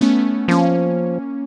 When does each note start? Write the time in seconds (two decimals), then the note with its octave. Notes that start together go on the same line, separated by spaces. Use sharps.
0.01 A3 B3 C#4
0.48 F3 A#3 C#4